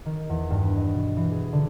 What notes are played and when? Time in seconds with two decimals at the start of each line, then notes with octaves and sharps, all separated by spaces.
0.05 D#3
0.29 E2
0.50 G2
0.63 B4
0.77 D#5
0.94 B2
1.17 E3
1.31 G#4
1.53 D3